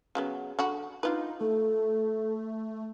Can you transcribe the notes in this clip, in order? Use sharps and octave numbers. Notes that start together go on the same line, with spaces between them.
C#3 F#3 B3
D3 F#4 B5
D4 D#4 F4 B4
A3 A4